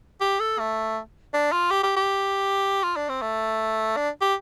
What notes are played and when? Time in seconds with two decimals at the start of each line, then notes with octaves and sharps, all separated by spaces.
0.20 G4
0.40 A4
0.59 A3
1.34 D4
1.52 F4
1.71 G4
1.83 G4
1.96 G4
2.83 F4
2.96 D4
3.09 C4
3.22 A3
3.96 D4
4.21 G4